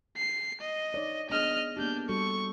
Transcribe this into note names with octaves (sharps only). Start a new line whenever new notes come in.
C7
D#5
D#4 C#5 D5
B3 D4 G#4 D#5 F6
A#3 B3 D4 G4 G6
G3 F#4 A4 C#6